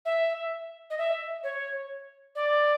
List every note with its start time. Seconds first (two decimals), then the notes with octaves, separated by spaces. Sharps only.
0.05 E5
0.90 D#5
0.98 E5
1.43 C#5
2.35 D5